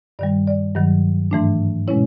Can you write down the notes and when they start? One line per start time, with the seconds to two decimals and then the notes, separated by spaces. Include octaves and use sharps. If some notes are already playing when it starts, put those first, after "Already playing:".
0.19 G2 D#3 G3 D5
0.47 D5
0.75 G2 D#3 F#3
1.31 G#2 E3 A3 D4
1.88 B2 G#3 C#4 E4 C#5